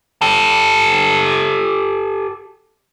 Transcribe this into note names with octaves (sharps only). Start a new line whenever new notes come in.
G4 A4